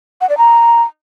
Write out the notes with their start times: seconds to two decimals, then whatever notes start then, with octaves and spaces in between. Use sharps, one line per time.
0.21 F#5
0.29 D5
0.38 A#5